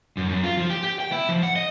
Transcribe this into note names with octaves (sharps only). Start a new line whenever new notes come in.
F#2
F#2
F4
F3
G4
G4
G5
E4
F3
F#5
D#5